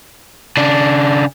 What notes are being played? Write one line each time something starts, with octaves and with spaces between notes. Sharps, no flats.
C#3 D4